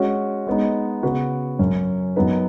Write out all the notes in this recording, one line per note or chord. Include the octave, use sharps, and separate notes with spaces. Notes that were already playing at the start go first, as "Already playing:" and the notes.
Already playing: G#3 C#4 F#4 C#5
G#3 B3 D#4
C#3 B3 F#4 B4
F#2 F#3 C#4
F#2 F#3 B3 D#4 B4